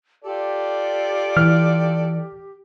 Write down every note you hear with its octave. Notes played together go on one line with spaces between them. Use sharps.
F4 G4 A4 D5
E3 F6